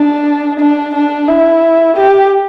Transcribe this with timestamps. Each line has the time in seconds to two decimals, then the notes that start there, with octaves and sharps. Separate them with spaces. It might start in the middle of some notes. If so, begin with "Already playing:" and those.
Already playing: D4
0.59 D4
0.94 D4
1.28 E4
1.97 G4